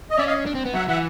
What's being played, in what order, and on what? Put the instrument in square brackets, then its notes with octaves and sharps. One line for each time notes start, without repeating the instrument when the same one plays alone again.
[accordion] D#5
[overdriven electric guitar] C#4 [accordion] D5 E5
[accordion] D#5 F5
[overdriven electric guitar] D4
C4
B3
[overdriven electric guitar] F#3 [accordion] E5 F#5
[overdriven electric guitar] E3 [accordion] E5 F#5